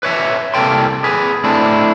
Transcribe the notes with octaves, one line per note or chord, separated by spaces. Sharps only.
B4 C#5 E5
C2 C3 A#3 A4 G5 C6
G#4 B4
A3 C4 D4 E4